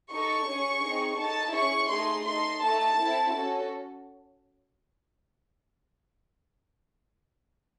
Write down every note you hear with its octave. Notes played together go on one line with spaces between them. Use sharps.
D#4 A4 C#6
C#4 G#4
C4 D#4 G#4
D#4 A4 A5
C#4 E4 G#4 C#6
A3 D#4 G#4 C6
D#4 A4 C6
A3 D#4 A4 A5
C4 E4 A4
C#4 F#4 A4